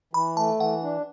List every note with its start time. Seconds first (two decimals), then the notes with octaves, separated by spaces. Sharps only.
0.13 E3 B5
0.37 A3 A5
0.60 E3 F#5
0.83 D4